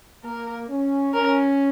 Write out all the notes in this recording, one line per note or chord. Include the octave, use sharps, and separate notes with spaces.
A#3 A#4
C#4
C#4 A#4